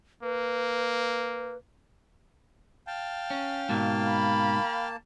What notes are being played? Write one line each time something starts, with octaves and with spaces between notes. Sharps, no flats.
A#3 B4
F5 G5 A5
C#4
G#2 B2 A#3 A5
B5